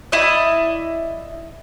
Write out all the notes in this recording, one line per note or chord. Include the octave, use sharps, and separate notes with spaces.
E4 D5 D#5